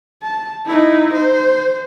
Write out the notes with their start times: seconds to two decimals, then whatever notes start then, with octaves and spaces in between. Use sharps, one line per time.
0.23 A5
0.66 D#4 E4
1.14 C5